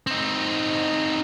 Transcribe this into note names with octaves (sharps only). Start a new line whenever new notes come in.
C4 D#4